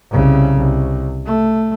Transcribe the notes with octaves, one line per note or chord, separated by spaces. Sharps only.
C2 C#3
C2
A3